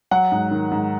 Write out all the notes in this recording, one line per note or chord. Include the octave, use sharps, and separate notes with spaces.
F#3 F#5
G#2
D#3
G#2